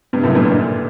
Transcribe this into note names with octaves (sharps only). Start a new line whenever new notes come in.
G2
F#2 A2
G2 A#2
A#2 D3